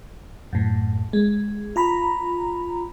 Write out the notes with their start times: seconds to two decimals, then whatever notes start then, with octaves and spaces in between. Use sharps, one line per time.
0.53 F#2 A2
1.13 G#3
1.76 F4 A#5 B5